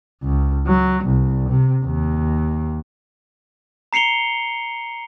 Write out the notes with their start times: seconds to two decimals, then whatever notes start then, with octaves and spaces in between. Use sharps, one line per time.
0.23 C#2
0.67 F#3
1.05 C2
1.50 C3
1.84 D#2
3.93 A#5 C7 C#7 F7 G7